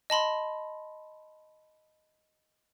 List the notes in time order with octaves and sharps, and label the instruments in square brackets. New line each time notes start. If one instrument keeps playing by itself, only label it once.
[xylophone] D#5 A5 B5 C6